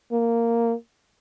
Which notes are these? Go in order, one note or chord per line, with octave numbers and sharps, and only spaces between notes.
A#3